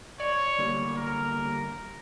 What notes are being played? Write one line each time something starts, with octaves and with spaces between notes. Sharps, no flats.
C#5 D5
D3 G3 A#3
A#4